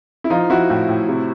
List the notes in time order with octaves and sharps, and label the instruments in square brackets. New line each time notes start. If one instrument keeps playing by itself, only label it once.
[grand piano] E4
F3 D#4 F4
F3 E4 F#4
A2
A2
C3